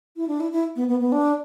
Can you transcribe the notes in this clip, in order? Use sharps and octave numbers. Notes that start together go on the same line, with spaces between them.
E4
D4
E4
E4
B3
B3
B3
D4